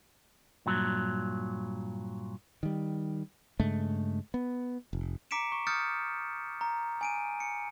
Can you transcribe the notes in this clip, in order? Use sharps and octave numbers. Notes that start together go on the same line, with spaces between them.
G2 A#2 F#3
D#3 G3
G2 C#3 G#3 A3
B3
F1
A#5 D6 B6 C#7 D7 E7
C#6
D#6 F6 G6 A6 C#7
A#5
G#5 D7 D#7
C#7